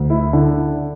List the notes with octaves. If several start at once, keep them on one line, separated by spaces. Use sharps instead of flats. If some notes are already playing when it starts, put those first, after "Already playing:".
Already playing: D2
E4
D3